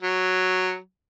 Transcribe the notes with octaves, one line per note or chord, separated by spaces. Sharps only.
F#3